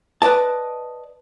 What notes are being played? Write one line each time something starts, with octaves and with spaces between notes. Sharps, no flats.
B4 D5 D#5 A5